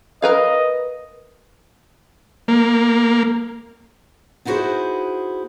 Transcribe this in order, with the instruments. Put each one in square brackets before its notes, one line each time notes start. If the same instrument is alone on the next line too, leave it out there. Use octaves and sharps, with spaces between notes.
[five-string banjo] A#4 B4 F5 [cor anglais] D#5
[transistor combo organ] A#3
[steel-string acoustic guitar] B3 D#4 E4 F#4 G#4 C5